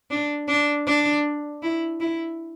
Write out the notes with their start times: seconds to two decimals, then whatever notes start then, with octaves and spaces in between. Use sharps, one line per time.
0.11 D4
0.48 D4
0.87 D4
1.63 E4
2.00 E4